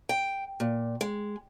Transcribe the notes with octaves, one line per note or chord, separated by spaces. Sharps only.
G5
A#2
G#3